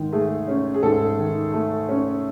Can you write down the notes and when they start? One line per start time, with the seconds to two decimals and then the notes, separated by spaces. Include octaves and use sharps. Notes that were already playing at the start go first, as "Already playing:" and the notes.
Already playing: G#2 D#3
0.12 A3 G#4
0.48 C#4
0.74 G#4
0.83 G#2 A4
1.18 D#3
1.53 A3
1.89 C#4